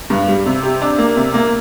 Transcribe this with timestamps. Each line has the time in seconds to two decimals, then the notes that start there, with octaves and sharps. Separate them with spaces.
0.10 G2
0.28 G3
0.46 C3
0.63 G4
0.81 D4
0.98 A#3
1.16 C3
1.34 A#3